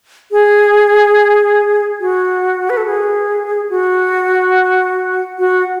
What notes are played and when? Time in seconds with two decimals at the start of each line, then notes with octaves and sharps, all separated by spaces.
0.32 G#4
2.00 F#4
2.70 B4
2.77 A4
2.86 G#4
3.70 F#4
5.39 F#4